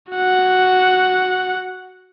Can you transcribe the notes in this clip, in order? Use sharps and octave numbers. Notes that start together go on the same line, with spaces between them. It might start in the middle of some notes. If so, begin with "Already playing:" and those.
F#4 F#5